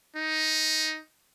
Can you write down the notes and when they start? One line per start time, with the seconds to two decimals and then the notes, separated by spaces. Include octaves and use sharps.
0.16 D#4